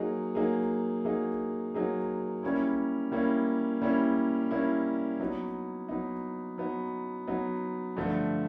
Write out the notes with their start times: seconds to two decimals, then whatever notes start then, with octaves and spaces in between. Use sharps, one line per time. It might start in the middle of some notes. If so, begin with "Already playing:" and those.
Already playing: F#3 A#3 D#4 G#4
0.35 F#3 A#3 D#4 G#4
1.05 F#3 A#3 D#4 G#4
1.74 F#3 A#3 D#4 G#4
2.43 G3 A#3 C#4 E4
3.12 G3 A#3 C#4 E4
3.82 G3 A#3 C#4 E4
4.51 G3 A#3 C#4 E4
5.20 F#3 B3 D#4
5.89 F#3 B3 D#4
6.58 F#3 B3 D#4
7.27 F#3 B3 D#4
7.97 G2 D3 F3 A3